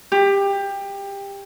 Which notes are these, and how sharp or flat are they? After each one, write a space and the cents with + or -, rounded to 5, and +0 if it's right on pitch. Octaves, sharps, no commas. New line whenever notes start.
G4 +20